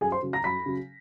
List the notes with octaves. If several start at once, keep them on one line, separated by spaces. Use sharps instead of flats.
F#2 G#4 G#5
C5 C6
C#3 F#3
A#5 A#6
F#2 B5 B6
C#3 F#3